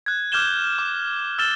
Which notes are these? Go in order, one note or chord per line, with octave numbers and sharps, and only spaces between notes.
F#6 G#6
D6 F6 G6 G#6 E7 G7
D6
E6 F6 A6 E7 G7